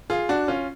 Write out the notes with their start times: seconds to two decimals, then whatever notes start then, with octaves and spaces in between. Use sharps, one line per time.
0.10 F4 G#4
0.29 D4 F#4
0.48 C#4 F4